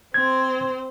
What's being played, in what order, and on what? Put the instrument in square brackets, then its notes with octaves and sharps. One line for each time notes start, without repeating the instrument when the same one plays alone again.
[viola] C4 C5 [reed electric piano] G#6